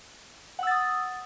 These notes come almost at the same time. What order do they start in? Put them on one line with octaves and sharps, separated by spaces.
F#5 E6 A6 D#6